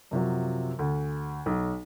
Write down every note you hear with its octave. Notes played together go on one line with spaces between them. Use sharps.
F#2 C3 F3 F#3
D2
B1